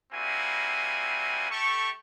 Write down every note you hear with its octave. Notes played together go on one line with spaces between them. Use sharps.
G3 A#3 C4 E4 F#4 G#5
A3 G4 A4 C#6